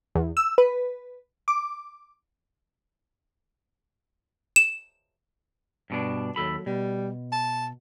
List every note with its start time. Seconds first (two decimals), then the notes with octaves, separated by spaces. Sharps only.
0.15 E2
0.37 E6
0.58 B4
1.48 D6
4.56 E7
5.90 G2 B2 D4
6.36 D#2 F#3 A4 B5
6.66 B2 G3
7.32 A5